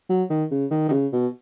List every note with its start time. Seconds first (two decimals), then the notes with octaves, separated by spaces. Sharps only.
0.09 F#3
0.30 D#3
0.51 C#3
0.71 D#3
0.88 D#3
0.92 C#3
1.13 B2